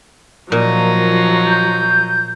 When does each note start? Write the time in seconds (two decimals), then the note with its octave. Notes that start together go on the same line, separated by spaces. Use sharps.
0.52 A#2 F3 F#3 D#4
1.47 G6